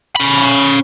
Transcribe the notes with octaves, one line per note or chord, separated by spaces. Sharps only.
C#4 B5